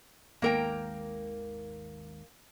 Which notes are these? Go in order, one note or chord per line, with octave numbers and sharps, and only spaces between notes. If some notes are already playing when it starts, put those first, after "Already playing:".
G#1 D#2 G#2 A#3 A#4 G5